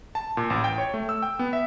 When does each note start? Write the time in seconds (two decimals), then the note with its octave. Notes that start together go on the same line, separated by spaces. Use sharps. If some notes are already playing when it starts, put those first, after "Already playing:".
0.15 A5
0.37 A#2
0.50 A1
0.64 G5
0.78 C#5
0.94 A3
1.09 E6
1.22 G5
1.39 B3
1.53 E5